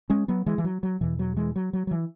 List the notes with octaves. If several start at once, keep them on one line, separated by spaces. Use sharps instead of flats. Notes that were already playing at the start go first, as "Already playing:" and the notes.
G#3 C#4
F#3 B3
E3 G#3
E3
F#3
F#3
E2 B2 E3
F#3
E3 G#3
F#3
F#3
F#3
E3